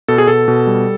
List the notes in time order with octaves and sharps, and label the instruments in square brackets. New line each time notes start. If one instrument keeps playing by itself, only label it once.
[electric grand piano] B2 A4
G#4
B2 A4
B2
G3